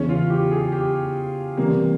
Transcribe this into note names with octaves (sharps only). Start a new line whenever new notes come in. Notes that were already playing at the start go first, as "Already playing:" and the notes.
Already playing: E2 C#3 E3 C#4
F4
G4
G#4
G4
C3 E3 G3 A#3